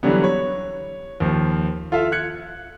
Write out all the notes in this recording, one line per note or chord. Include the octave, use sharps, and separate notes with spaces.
D3 E3 F#3 G3 B3
C#5
D#2 F3
F4 A4 E5 F5
F#6 G#6 C#7